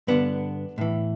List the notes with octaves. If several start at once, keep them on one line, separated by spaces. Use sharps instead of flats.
G2 D3 B3 D4
A2 E3